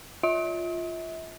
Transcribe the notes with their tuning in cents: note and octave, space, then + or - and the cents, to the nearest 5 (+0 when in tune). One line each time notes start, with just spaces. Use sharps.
F4 +0 E5 -35